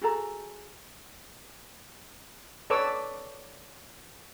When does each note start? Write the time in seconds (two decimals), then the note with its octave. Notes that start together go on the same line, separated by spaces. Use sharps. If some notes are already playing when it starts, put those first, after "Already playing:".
0.01 F#4 G#4 A4 A#5
2.70 A4 B4 C#5 D5 D6 E6